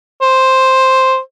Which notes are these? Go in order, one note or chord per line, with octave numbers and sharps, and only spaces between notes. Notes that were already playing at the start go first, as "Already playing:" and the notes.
C5